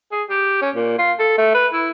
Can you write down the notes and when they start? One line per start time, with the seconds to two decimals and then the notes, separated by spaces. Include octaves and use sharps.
0.12 G#4
0.30 G4
0.62 C#4
0.75 A#2
0.99 F4
1.19 A4
1.38 A3
1.55 B4
1.73 E4